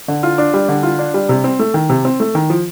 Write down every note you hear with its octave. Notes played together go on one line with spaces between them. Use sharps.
D3
F4
D4
G3
D3
F4
D4
G3
C3
C4
A3
D#3
C3
C4
A3
D#3
F3